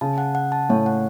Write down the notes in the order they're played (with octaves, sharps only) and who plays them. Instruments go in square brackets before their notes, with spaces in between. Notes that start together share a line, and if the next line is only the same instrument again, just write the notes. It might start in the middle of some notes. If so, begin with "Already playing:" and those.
[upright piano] C#3 [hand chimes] A5
[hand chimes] F#5
F#5
A5
[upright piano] A2 [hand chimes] C#5
[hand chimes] F#5